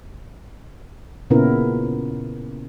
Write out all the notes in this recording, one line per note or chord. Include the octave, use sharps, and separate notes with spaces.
A#2 C#3 B3 C#4 E4 A#4